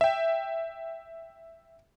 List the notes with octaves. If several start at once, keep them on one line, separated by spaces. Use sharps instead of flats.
E5 G5